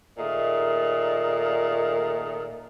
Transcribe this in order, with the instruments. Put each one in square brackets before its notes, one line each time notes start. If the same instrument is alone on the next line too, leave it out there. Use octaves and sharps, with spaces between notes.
[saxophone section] A#2 D#3 A3 G#4 A#4 D#5